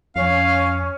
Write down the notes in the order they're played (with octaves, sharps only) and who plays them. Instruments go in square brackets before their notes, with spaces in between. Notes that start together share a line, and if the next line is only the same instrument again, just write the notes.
[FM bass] F2 [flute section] C#4 [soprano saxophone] F5